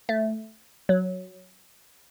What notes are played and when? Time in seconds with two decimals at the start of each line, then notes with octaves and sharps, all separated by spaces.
0.09 A3
0.89 F#3